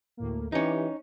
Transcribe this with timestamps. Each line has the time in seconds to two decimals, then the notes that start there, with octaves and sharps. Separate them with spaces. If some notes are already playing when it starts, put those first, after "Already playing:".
0.17 D2 A2 A#3
0.52 E3 C#4 D#4 G4